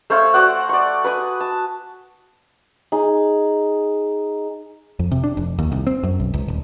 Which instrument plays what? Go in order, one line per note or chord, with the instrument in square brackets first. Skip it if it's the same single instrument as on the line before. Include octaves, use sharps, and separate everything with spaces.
[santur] A3 C5 C#5 F5
F#4 C5 D5 F#5
D5 C#6
B4 G#5 D#6
A5
D#4 G#4
[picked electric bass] F2
C3
D4
F1
D#2
C2
C4
F#2
B1
C#2
D#1